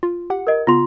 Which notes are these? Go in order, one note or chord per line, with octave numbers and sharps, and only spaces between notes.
F4
G4 F#5
A#4 D#5
C#3 B3 F4 C6